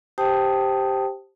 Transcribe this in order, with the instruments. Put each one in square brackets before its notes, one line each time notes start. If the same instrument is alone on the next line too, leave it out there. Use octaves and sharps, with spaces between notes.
[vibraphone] G4 C5 G5 A5 D#6